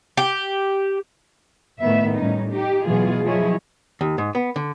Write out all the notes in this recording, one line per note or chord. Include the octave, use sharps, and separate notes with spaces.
G4
A2 D#3 B3 E5
A2 G3 C#4 D#4
D#4 G4
B2 E3 F#3 F4 G#4
F3 F#3 E4 G#4 C#5 D#5
D#2
G#2
B3
D3